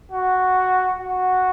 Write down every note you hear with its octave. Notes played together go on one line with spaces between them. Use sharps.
F#4
F#4